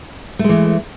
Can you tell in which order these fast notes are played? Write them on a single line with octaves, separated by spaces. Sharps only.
A3 G#3 E3